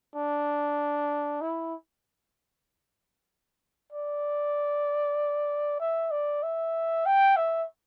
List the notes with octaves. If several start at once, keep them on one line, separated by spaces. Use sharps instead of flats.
D4
E4
D5
E5
D5
E5
G5
E5